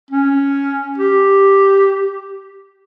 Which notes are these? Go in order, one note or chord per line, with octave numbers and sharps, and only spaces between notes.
C#4
G4